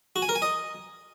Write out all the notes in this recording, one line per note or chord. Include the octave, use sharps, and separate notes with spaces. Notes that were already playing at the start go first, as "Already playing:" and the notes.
F#4
G#5
A#4
G#5
D#5